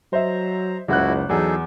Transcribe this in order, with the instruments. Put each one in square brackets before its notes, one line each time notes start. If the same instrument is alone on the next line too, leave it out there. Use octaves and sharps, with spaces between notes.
[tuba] F#3 [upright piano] C5 D#5 E5 [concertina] A#5
[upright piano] F#1 F#5 F#6 [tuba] C#2 [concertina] E4 F#4
[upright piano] E2 [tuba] F#3 [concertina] D#4 G#4 A4